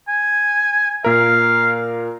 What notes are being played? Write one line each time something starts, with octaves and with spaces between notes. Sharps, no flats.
G#5
A#2 A#4 F5